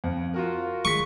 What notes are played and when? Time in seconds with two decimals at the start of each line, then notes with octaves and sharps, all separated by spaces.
0.04 F2
0.34 F4 F#4 A#4
0.85 G#3 C#6 B6